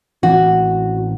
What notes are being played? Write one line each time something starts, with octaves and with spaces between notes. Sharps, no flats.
A1 E3 C4 F#4